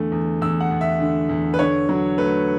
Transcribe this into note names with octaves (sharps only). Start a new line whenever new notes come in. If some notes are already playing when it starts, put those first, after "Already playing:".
Already playing: E2 D3 A3
E2
E2 E6
F#5
E2
E5
D3
E2
B4
D3 C#5
F#3
A3 B4